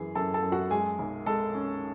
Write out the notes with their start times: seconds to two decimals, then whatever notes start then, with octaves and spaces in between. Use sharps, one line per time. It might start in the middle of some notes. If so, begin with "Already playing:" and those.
Already playing: F#2 E3 G#4
0.15 F#2 A4 A5
0.34 A4 A5
0.43 F#2
0.52 F#4 F#5
0.70 G#3 G#4 G#5
0.99 B1
1.26 G#3 A4 A5
1.55 C#4